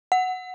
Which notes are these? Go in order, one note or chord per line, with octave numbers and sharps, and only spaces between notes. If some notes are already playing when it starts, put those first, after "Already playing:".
F#5